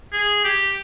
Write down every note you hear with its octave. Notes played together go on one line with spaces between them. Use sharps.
G#4
G4